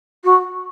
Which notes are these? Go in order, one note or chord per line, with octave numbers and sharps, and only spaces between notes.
F#4